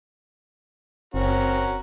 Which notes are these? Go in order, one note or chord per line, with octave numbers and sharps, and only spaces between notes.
F#1 C4 C#4 F#4 A#4